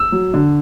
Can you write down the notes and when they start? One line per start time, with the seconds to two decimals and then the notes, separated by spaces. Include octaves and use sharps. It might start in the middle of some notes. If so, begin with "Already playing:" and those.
Already playing: E6
0.12 F#3
0.34 D3